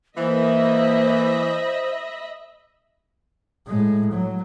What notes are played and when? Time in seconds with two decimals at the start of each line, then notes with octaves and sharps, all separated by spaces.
0.17 E3 A#3 C5 D#5 E5 B5
3.67 A2 G#3
4.12 F#3